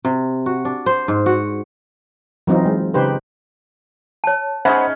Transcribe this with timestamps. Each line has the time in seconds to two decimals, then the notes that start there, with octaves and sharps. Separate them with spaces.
0.05 C3
0.46 F#4
0.65 D4
0.86 C5
1.08 G#2
1.26 F#4
2.47 E3 F#3 C4 D#4 F4
2.65 G#3
2.94 C#3 D#4 G4 B4 C5
4.24 C#5 A5
4.65 C#4 D#4 G#4 C5 E5 F#5 B5